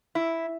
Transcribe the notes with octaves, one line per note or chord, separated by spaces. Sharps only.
E4